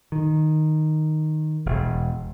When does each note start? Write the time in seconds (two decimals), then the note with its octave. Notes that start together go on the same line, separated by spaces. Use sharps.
0.12 D#3
1.66 E1